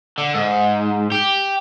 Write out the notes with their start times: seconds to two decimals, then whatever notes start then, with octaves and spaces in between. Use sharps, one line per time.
0.18 D3
0.35 G#2
1.12 G4